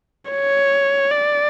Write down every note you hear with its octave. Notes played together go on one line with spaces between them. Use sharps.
C#5
D5